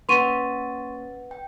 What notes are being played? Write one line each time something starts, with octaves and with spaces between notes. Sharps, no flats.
A#3 C#4 B4 F#5 C6 C#6 A6 D#7
G5